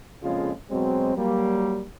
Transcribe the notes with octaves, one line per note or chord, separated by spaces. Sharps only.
F2 A#2 C#3 G#3 C#4 F4
B2 F#3 G#3 C4
F#3 G3 A#3